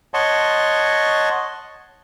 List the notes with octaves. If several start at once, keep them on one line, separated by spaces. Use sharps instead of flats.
C#5 D#5 F#5 A5 C6 C#6